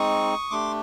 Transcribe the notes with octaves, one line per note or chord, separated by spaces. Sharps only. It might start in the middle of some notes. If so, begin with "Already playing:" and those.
Already playing: G#3 C4 D#4 C#6 D#6
A3 D4 G4 C6 D6